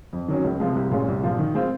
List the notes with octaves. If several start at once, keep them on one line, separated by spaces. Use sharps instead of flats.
F2
D#3 F#3 C#4
C#2
C3 F3 G#3
C2
A#2 G#3 C#4
C2
A#2 F3
D#3
G#3 C4 F4